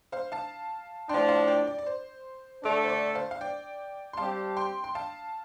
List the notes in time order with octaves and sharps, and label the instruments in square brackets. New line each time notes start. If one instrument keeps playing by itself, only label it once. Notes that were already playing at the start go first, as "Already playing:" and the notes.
[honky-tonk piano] C5 F5
F5 A5
[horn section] A2 F3 D4 [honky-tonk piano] G5 C6
[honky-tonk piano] F5 A5
D5 G5
D5
D5
C5
[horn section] D3 A3 D4 A4 [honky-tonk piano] D5
[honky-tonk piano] C5
D5
D5
C5 F5
F5
D5 G5
C6
[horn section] G3 C4 G4 [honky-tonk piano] F5 A5
[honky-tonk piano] G5 C6
C6
F5 A5